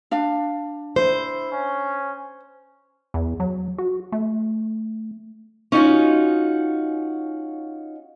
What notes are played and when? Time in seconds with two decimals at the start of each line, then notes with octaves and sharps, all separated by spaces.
0.11 D4 F5
0.96 E4 C5
1.52 C#4
3.14 E2
3.40 F#3
3.78 F#4
4.12 A3
5.72 C#4 D#4 F4 F#4